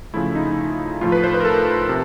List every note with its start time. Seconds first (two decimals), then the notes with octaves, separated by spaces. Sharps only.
0.14 C#3 F3 A3 E4
0.35 D#4
1.01 A2 F3 A3 F4
1.12 B4
1.24 C5
1.34 B4
1.40 A#4
1.45 A4
1.89 C3